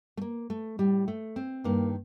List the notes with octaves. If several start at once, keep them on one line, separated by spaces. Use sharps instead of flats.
A3
A#3
A3
A2 G3
A3
C4
G2 D#3 A#3